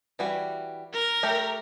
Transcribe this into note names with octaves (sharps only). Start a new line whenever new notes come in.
E3 G3 F#4
A#4
A3 G4